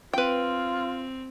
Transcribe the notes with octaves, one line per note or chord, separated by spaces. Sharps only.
C4 F4 B4 G5